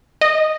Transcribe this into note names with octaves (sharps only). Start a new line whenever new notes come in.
D#5